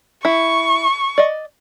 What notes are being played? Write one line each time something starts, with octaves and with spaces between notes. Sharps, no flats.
E4 C#6
D5 D#5